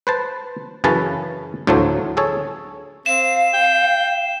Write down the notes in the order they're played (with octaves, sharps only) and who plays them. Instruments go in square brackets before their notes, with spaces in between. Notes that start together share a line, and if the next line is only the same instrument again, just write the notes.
[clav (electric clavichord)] B4 C5 A5
F#2 C#3 E3 C#4 B4 A5
D2 A2 F3 F#3 A3 C5
G#4 A4 C#5
[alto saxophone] C4 [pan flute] F5 [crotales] E7
[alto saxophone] G5